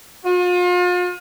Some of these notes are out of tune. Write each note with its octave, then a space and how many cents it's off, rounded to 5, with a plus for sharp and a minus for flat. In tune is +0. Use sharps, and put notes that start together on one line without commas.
F4 +40